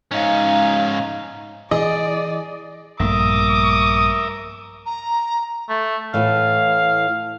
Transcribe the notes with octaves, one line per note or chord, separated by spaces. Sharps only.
G#2 C#4 D#4 F5
E3 G#4 D5 D#5
A#1 G2 A3 A#4 E5 D6 D#6
A#5
A3
A2 E3 F5